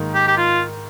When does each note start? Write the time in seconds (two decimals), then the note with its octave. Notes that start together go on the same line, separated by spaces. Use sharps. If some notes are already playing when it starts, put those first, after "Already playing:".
Already playing: G#2 D#3 A#3 D#4
0.14 G4
0.27 G4
0.37 F4